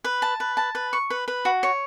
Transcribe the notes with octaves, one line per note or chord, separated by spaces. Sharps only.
B4
A5
B4
A5
B4
C#6
B4
B4
F#4
C#5